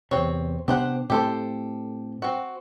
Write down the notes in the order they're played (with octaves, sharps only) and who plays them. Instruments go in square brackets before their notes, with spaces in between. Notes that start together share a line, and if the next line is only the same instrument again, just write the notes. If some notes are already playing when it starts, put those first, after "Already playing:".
[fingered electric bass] E2 C3 [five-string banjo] C4 C#5
[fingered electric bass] C3 B3 D4 [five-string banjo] G4 C5 F#5
[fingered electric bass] A2 A3 C4 [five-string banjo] G4 A4 C5
[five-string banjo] C4 F#4